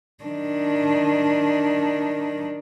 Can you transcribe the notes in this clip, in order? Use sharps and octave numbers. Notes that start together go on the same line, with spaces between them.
D#3 D4